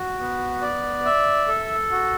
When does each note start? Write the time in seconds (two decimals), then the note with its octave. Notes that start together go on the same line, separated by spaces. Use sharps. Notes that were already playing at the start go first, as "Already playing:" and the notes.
Already playing: F#4
0.19 B3
0.62 D5
1.05 E5
1.48 A4
1.91 F#4